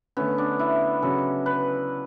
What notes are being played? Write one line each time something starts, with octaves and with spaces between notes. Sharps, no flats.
D3 A3 B3 C#4
D4
E4
C#3 F#3 C#4 F#4 A4
B4